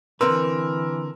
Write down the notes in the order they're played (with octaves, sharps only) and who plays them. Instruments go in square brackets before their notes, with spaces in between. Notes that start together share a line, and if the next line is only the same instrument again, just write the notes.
[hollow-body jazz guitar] D3 C4 B4 [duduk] E3 [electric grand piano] A#4 E6 [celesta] C6